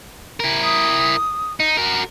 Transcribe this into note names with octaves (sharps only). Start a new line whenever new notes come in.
E4 A#4
D#6
D#4
F#4 A#4